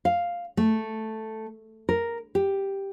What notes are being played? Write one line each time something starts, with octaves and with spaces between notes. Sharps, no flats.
F5
A3
A#4
G4